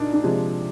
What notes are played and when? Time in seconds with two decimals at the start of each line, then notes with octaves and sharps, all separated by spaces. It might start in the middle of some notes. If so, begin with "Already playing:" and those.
Already playing: A#2 D4 D#4
0.13 D4
0.24 C3 F3 G#3